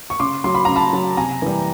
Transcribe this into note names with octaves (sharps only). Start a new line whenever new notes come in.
C#6
C#3 C6 D6
F#3 C6
B5
C#3 A#5
A5 B5
F#3
C3 G#5 A#5
E3 G3